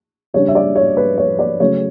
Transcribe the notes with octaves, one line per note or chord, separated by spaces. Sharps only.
C#3 G3 D4 C#5
E5
D5
C#5
B4
C#5
D5
C#3 F#3 A3 C#5